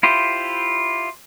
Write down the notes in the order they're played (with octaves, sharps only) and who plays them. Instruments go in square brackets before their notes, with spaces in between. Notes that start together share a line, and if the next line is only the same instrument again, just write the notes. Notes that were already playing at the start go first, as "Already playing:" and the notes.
[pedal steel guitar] E4 F4 G4 C5